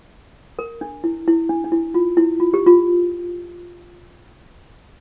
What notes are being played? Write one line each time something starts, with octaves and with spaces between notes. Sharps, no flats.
A#4
D4
E4
E4
D4
D4
E4
F4
E4
F4
G4
F4